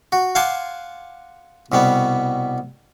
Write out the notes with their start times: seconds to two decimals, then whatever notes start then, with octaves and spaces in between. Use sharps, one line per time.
0.12 F#4
0.35 F5 F#5 G#5 A5 C6 D6
1.72 C2 B2 G3 B3